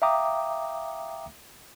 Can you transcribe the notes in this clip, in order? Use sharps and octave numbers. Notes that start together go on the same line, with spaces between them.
E5 F5 G5 A#5 D6 D#6